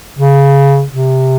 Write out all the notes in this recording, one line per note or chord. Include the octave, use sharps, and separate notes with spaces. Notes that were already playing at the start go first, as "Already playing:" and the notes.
C#3
C3